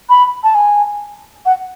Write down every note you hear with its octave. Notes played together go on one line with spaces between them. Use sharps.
B5
A5
G#5
F#5